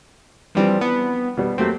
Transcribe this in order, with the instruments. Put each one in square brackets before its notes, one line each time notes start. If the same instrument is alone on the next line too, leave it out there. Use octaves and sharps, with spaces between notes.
[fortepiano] E3 D4 [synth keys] F3 G3 C4
[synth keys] B3
[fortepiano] B2 G3
[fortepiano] F#3 A#3 G4 [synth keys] A3 C4